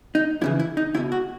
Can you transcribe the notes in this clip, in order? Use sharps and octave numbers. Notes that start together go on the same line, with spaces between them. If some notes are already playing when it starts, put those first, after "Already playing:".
D#4
F2 C#3 E3 E4
E4
D#4
C#2 B2 E4
F#4